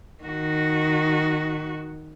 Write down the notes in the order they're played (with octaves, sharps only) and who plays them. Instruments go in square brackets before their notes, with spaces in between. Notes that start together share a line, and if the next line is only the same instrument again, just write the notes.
[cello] D#3 F#4